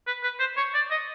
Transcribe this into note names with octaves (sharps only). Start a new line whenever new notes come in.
B4
B4
C5
C#5
D5
D#5